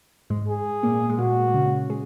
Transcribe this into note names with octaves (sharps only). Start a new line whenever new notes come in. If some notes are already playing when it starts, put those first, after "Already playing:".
G#2 G#3
G#4
A#2 A#3
G#3
A#2 A#3 F#4
A#3
C#3 C#4
G#3 G#4